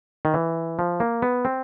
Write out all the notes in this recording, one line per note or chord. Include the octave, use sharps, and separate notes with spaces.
D#3
E3
F3
A#3
B3
C4